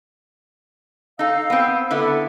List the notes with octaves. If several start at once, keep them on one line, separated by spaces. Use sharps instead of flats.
D#4 A4 F5 E6
B3 C4
D3 B3 E4 A4